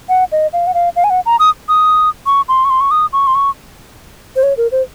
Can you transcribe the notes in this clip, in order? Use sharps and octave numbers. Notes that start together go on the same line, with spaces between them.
F#5
D#5
F5
F#5
F5
F5
G#5
F#5
A#5
D#6
D#6
C#6
C6
C#6
C6
C#6
D#6
C#6
C6
C#6
C5
C#5
A#4
C5